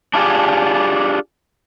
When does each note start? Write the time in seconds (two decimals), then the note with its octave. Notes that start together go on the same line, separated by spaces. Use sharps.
0.14 D4 E4 F4 G4 G#4